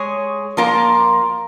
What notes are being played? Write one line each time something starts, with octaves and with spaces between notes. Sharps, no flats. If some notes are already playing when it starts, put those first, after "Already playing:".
Already playing: G#3 G#4 C#5
F3 A#3 F4 A#4